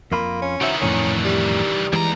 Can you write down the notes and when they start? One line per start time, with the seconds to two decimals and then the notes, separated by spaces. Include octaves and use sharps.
0.12 F2 A#3 F4 B5
0.42 C#4
0.61 D#3 E3 F#4 C5 E5
0.81 F2 A2 D3 C#4
1.25 G3
1.93 D#2 E3 G#3 D5 A#5